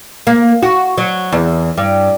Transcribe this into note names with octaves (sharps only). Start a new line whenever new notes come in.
A#3
F#4
F#3
E2
G2